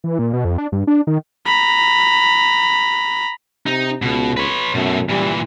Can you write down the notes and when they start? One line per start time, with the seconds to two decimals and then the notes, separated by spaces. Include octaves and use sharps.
0.04 E3
0.19 A#2
0.33 B2
0.45 F2
0.58 D4
0.72 G2
0.87 D4
1.07 D#3
1.46 A#5 B5
3.66 C3 D#4
4.02 C#2 B2
4.37 B4 C#5
4.75 F#2 B2 A3
5.09 A#2 E3 G3